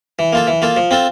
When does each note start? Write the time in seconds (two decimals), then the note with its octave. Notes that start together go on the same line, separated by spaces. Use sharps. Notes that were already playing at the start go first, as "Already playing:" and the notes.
0.19 E3
0.33 A#3 F4 A4
0.47 E3
0.62 A#3 F4 A4
0.77 F3
0.91 C4 F4 A4